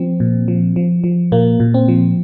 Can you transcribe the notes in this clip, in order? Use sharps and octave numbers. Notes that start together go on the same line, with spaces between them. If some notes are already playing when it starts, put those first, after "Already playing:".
Already playing: F3 C4
A#2
F3
F3
F3
A#2 A#3
A#2
C4
F3